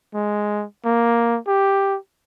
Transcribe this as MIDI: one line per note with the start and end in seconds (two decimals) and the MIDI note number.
0.14 0.64 56
0.85 1.38 58
1.47 1.97 67